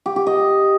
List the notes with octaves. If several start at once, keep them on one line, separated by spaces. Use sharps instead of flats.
G4
G4
D#5